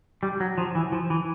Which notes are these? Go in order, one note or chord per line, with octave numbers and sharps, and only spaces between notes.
G3
F#3
F3
E3
F3
E3